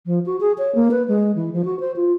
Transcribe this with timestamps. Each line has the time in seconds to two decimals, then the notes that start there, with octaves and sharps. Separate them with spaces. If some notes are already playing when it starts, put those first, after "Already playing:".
0.06 F3
0.26 F#4
0.40 G#4
0.58 C#5
0.75 A#3
0.91 B4
1.08 G#3
1.35 E3
1.53 F3
1.65 F#4
1.80 C5
1.96 F4